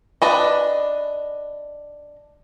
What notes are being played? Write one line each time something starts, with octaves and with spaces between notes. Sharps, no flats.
D4 B4 D#5